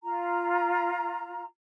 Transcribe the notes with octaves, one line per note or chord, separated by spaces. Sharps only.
F4 A#5